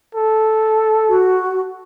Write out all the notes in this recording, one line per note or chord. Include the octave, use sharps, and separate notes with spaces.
A4
F#4